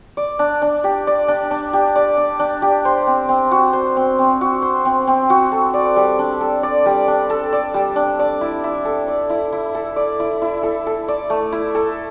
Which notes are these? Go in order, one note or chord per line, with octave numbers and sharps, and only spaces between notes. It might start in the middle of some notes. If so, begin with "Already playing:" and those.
D5
D4
D4
G4
D5
D4
D4
G4
D5
D4
D4
G4
C5
C4
C4
F#4
C5
C4
C4
F#4
C5
C4
C4
F#4
A4
D5
G3
D4
A4
D5
G3
D4
A4
D5
G3
D4
D5
E4
E4
A4
D5
E4
E4
A4
D5
E4
E4
A4
A4
D5
A3
E4
A4